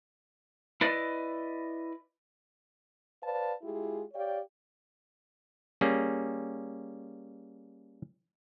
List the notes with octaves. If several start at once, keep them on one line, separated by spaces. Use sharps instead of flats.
E4 B4 D5 D#5
B4 C5 D5 F5 A5
G#3 E4 F4 G4 G#4
G4 C#5 D5 F5 G5
G3 A#3 C#4 G#4